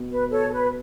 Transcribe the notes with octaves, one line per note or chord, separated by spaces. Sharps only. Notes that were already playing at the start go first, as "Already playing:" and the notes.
Already playing: B2
B4
A4 C#5
A4
B4